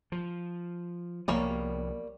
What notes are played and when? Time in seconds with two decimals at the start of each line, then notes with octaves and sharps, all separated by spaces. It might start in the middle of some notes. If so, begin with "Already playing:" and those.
0.12 F3
1.28 C2 F3 G3 A#3 B3 C#5